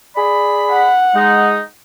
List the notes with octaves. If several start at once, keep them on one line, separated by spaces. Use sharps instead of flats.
G#4 D5 B5
F#5
G#3 D#4